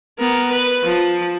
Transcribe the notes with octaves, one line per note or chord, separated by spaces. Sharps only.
B3 A#4
B4
F3